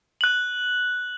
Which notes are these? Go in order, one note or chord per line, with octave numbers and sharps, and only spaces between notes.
F#6 F#7